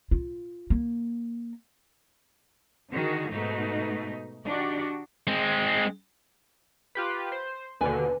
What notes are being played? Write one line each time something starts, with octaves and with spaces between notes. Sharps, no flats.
F4
A#3
D3 D#3 F#4 G#4
G#2 B2 A3 D#4
D#3 D4 D#4 F#4 G4 D5
G#3 C4
F4 G4 B4
C5
D#2 B2 D3 B4 G#5